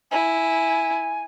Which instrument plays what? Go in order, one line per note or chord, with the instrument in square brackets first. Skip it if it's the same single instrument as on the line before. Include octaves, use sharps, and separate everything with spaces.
[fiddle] E4 [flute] G#5